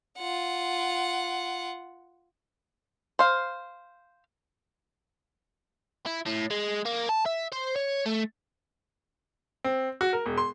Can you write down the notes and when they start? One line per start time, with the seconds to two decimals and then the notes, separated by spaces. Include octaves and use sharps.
0.18 F4 F#5
3.19 C5 F5
6.06 E4
6.26 A2
6.51 G#3
6.85 A#3
7.09 A5
7.26 E5
7.52 C5
7.76 C#5
8.06 A3
9.64 C4
10.01 F#4
10.13 A#4
10.26 E1
10.38 C6